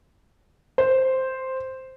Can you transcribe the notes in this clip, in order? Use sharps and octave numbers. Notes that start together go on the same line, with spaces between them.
C5